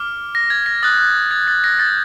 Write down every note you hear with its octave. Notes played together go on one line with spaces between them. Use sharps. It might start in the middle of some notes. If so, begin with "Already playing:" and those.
Already playing: D6 F6
A#6
G#6
A#6
D#6 F#6 A6
G#6
A6
A#6
D#6 G6 A6